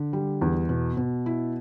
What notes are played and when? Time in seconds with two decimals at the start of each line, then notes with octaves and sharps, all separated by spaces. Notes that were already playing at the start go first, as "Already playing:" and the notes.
Already playing: D3
0.13 G3
0.41 E2
0.69 B2
0.97 B2
1.26 E4